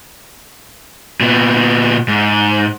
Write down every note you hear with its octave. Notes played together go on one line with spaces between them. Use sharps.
A#2 B3
G#2